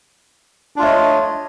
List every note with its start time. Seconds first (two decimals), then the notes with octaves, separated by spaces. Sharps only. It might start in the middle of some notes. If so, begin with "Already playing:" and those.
0.76 D4
0.79 F4
0.81 A3
0.84 C#5
0.87 D#5